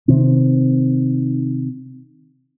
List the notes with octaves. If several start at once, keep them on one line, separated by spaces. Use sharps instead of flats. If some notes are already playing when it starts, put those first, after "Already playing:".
C3 D#3 C4